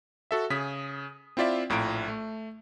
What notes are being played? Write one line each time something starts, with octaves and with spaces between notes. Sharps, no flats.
F#4 A4 E5
C#3 G#4 D#6 B6
C4 E4 F4 D5 E5
A#1 A2 F4 A#5 D7
A3